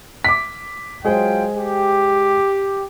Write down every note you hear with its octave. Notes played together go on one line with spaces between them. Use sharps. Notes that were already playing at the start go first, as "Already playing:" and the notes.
D6 B6
F#3 G#3 F4 G#4 C5 G5
G4